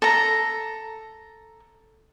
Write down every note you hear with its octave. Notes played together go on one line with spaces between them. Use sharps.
A4 A#5